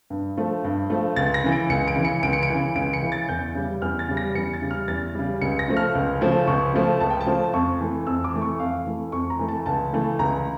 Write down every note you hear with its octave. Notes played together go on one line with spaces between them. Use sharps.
G2
F3 A3
G2
F3 A3
C#2 A6
A#6
C#3 E3
D7
C#2 C#7
D7
C#3 E3
C#7
C#2 D7
C#7
D7
C#3 E3
C#2 D7
C#7
C#3 E3
A6
E2 G6
C#3 G3
E2 F6
A6
C#3 G3
A#6
E2 C#7
A6
C#3 G3
F6
E2 A6
C#3 G3
C#2 C#7
A#6
C#3 F3 A3
F6
C#2
C#3 F3 A3
C#2 C#6
C#3 F3 A3
C#2 A5
G5
A5
C#3 F3 A3
F2 C#6
E3 A3
F2 E6
D6
E3 A3
C#6
F2 F5
E3 A3
F2 C#6
A#5
E3 A3
A5
C#2 A5
C#3 E3 A3
C#2 A#5